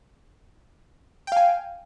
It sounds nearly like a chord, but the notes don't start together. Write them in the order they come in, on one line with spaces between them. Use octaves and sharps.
G5 F5 G#5